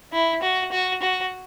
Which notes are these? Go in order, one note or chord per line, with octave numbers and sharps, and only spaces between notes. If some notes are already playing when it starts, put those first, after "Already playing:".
E4
F#4
F#4
F#4